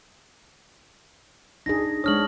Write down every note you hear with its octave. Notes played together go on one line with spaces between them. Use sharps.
D4 D#4 G#4 A#6
G#3 D4 C#5 D#6 F6 F#7